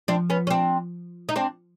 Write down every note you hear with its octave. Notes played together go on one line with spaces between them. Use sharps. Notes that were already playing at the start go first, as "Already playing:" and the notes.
F3 C4 D4
B3 C#4
C#4
C4 D4
D#4
C4 D4